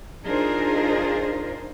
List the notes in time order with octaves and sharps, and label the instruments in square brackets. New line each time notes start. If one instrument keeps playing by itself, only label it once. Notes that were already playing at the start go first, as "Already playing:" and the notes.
[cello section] D4 D#4 F4 G#4 A#4 C5